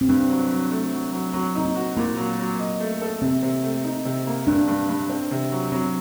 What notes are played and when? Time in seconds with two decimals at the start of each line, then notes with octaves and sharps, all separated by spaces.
0.01 C4
0.09 G2 D4
0.29 F#3
0.51 F#3
0.71 A3
0.92 F#3
1.13 F#3
1.33 F#3 C4
1.55 C4 D#4
1.65 A#3
1.75 F#4
1.97 A#2 A#3
2.17 F#3
2.39 F#3
2.59 D#5
2.80 A3
3.02 A4
3.22 C3 C4
3.43 C3
3.63 A3
3.84 D#4
4.05 C3
4.27 A#3
4.47 G2 D4
4.68 G2
4.89 G2
5.09 C4
5.31 C3
5.51 F#3
5.72 F#3 C4